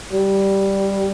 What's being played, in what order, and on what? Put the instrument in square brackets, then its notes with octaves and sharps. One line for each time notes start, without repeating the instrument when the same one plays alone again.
[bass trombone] G3